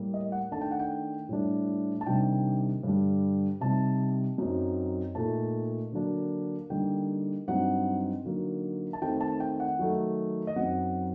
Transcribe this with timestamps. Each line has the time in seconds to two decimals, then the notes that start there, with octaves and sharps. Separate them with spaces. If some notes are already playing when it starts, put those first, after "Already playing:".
Already playing: A2 G3 A#3
0.14 D#5
0.32 F#5
0.51 D#3 A3 D4 A5
0.61 G5
0.71 F#5
0.79 G5
1.29 A2 G3 D4
2.01 A5
2.07 C3 D#3 G3 D4 G5
2.83 G2 D3 G3 D4
3.61 C3 G3 C4 D#4 A5
4.38 F#2 F#3 C4 D#4
5.15 A#2 A3 D#4 A5
5.92 D3 F#3 A#3 D4
6.70 D3 G3 A#3 D#4 G5
7.47 G2 F#3 C4 D#4 F#5
8.24 D3 F#3 A#3 D#4
8.93 A5
9.02 D#3 A3 C4 G5
9.21 A5
9.40 G5
9.60 F#5
9.79 D#3 F#3 A3 D#4
10.47 D#5
10.56 F#2 F#3 C4 D#4 F#5